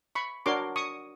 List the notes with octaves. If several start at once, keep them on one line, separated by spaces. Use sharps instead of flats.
B5 C#6
D4 F#4 A#4 C#5 C6 D6
C#6 D#6